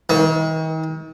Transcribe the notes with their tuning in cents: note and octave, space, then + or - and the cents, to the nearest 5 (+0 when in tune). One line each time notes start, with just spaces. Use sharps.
D#3 +40